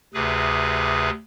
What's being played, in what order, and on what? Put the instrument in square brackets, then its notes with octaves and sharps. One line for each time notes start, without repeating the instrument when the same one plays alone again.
[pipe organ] D2 C3 G#4 B4